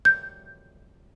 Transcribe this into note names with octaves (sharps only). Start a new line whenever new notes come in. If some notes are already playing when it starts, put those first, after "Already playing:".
G6